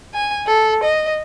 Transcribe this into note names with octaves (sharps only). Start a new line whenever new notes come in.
G#5
A4
D#5